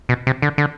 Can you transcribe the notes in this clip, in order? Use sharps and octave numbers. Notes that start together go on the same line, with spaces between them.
B2
C3
D3
D3